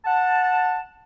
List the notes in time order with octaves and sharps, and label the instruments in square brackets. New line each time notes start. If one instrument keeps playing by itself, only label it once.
[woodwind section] F#5 A5